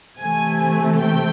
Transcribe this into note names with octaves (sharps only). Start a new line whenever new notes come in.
C3 E3 A3 G#5
G5